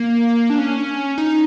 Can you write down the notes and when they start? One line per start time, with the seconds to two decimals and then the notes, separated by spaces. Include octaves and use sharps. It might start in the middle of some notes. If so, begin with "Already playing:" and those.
Already playing: A#3
0.50 D4
0.58 C#4
1.18 D#4